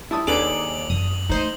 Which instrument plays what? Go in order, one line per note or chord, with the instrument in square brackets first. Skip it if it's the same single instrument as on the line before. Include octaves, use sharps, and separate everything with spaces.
[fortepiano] E4 A5 D#6
[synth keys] D#2 G#4 D6 [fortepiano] D4 A4 B4 [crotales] F7 F#7
[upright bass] F#2 [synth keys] D#6
[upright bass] A3 [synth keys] D#4 C5 D#5